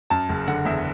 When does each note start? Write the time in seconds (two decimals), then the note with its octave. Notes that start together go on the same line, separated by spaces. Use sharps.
0.10 F#2 A5
0.29 F#1
0.48 D3 F#5
0.65 E2 E5